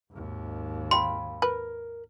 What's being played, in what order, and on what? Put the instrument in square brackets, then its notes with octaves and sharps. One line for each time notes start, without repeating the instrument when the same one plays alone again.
[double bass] G#1 D#2
[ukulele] F5 G5 B5 [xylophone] C6
[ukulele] A#4 [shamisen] B4